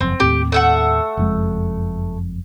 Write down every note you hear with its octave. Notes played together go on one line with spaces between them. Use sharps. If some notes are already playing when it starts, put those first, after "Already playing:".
F#1 F2 C4
D#2 A2 C4 G4
A3 E5 F#5
F#1 F2 G#3